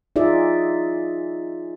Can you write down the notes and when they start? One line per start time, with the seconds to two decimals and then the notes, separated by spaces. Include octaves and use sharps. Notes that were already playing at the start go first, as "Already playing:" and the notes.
0.16 D#4 F4 G#4 D5 E5